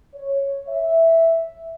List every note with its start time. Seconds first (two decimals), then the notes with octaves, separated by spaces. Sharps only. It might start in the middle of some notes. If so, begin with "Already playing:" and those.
0.15 C#5
0.68 E5